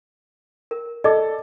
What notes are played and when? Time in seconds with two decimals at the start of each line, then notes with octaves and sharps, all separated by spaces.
0.71 A#4
1.04 A4 D5 D#5 D6